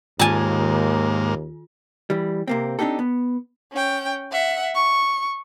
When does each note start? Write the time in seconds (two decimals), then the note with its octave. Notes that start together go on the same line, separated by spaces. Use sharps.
0.19 D#2 G#2 D#3 A#3 F4 G#5 A5
2.10 E3 G3
2.47 C3 A#3 C4
2.79 C4 D4 D#4 G4 A4
2.99 B3
3.72 C#4 G5
4.32 E5 F#5
4.75 C#6